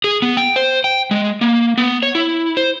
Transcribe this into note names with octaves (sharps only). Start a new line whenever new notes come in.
G#4
B3
G5
C5
G5
G#3
A#3
B3
C#5
E4
C5